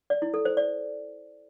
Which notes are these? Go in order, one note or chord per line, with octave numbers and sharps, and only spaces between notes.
D5
E4
A4
C5
D5